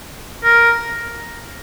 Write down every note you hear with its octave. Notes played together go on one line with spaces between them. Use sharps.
A#4